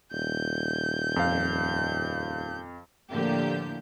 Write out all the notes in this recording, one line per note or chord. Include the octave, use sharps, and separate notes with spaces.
D#1 G6
F2 F5
A2 D3 F3 A#3 G4 G6